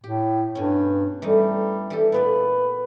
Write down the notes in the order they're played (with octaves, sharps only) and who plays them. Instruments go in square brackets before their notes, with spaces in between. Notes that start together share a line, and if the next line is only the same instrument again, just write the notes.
[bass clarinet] A2 [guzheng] G4
[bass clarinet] G2 [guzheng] B2 C#4
[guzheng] E3 A3 D#4 [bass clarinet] G3
[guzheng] E3 G4 A4
[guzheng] A#2 B3 D5 [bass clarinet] B4